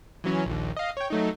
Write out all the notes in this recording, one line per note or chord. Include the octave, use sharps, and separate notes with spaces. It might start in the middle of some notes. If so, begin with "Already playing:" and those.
E3 F#3 C#4
A#1 D#2
D#5 F5
C#5 G5
F#3 A3 D#4